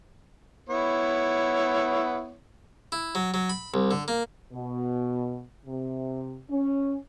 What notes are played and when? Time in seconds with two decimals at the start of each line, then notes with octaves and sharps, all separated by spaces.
0.69 B3 E4 C#5
2.92 E4
3.15 F#3
3.34 F#3
3.49 B5
3.74 C2
3.91 D3
4.08 A#3
4.52 B2
5.66 C3
6.50 C#4